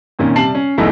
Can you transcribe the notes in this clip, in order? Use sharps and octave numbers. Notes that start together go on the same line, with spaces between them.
F2 A#2 D#3 C#4
C3 G3 A5 C7 F#7
C#4
E1 B1 E2 A3 D#4 E4